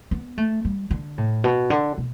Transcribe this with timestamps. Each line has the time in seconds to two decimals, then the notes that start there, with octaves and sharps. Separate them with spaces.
0.11 B3
0.38 A3
0.65 G3
0.91 D3
1.18 A2
1.44 B2
1.70 D3
1.98 B2